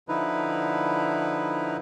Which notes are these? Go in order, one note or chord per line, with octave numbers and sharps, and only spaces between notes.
D3 F3 D#4 E4 B4